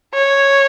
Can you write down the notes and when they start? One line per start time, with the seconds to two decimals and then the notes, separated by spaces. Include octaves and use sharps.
0.14 C#5